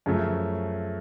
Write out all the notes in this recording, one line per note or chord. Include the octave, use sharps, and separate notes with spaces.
F#2 C#3 F3 A3